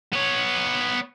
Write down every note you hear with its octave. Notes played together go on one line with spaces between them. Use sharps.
B3 C#5